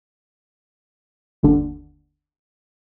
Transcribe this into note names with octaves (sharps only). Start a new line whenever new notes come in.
G1 D#2 D3